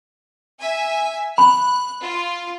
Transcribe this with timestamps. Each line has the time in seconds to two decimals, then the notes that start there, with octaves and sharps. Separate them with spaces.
0.58 E5 G#5
1.38 B5 F#6
2.02 F4